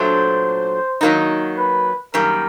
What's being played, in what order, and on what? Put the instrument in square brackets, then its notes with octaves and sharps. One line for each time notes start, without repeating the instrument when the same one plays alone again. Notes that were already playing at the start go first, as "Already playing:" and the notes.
Already playing: [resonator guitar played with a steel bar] A#2 F#3 A3 D4 [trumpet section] C5
[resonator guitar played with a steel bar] D#3 F#3 A#3 D#4
[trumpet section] B4
[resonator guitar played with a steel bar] F#2 D#3 G3 A#3 [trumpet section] A#4